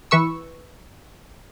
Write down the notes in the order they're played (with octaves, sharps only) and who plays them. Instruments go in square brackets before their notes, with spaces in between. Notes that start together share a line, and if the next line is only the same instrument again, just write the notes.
[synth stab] E3 B4 C#6 E6